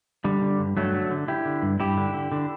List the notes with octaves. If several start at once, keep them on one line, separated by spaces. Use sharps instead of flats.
D3 G3
D3
G2
G2 F#3 A3
D3
D3
D3 E4 G4
D3
G2
G2 E4 G4
D3
D3
D3